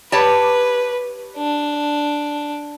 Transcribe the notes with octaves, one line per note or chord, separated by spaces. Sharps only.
G4 B4 C#5 A5
D4